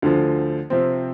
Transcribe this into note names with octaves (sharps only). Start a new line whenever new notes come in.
D2 D3 F3
C3 F3 C4